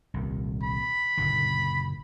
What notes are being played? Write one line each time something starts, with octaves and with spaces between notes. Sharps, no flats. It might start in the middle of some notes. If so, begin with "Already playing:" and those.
D#1 C2
B5
F#1 A#2 D3